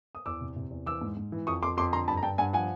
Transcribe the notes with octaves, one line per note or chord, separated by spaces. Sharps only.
D#6
E2 D6 E6
C3
C3
E2
E3 D6 E6
G#2
G#2
E3
F2 C#6 D#6
F2 C6 D6
F2 C6 D6
D3 A#5 C6
G2 A5 B5
A#5
G2 G5 A5
G2 F#5 G#5
F3 F#5 G#5